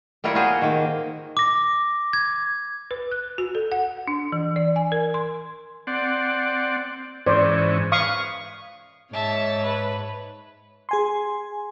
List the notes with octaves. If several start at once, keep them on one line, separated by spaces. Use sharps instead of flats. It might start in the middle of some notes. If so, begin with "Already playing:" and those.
G3 A#3 E4 F4 A#4 C#5
F4 F#4 G#4 C5
D#3 A#3
D6 A#6
G#6
B4
F#6
F#4
A4
F#5
D4
E3
D5
G#5
A#4
C6
C4 D5 F#5
G#2 E3 C#4 C5 D5
B4 F5 C#6 D#6
G#2 C#5 E5 A5
B4
G#4 G#5 C6